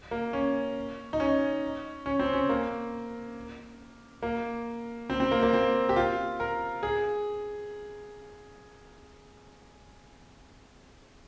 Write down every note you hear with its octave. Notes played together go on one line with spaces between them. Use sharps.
A#3
C#4
D#4
C#4
C#4
C4
C#4
A#3
A#3
C4
C4
A#3
A#3
C4
G4
F4
A#4
G#4